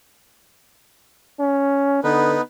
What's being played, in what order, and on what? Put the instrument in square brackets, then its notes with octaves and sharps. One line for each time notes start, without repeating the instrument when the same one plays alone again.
[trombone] C#4
[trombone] D3 [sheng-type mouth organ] B3 D#4 B4